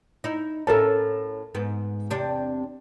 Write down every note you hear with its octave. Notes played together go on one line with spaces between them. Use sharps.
D#4 E4
A2 C#4 A4 A#4 A5
G#2 B3
E2 C3 D4